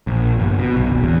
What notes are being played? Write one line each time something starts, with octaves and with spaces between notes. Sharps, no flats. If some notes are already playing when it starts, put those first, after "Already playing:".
A#1
G1
B2
B1
D1
E2